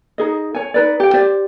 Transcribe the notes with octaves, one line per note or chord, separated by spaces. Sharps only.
D#4 G#4 D#5
C#5 G#5
D#4 B4 D5
G4 G5
G4 C5 D5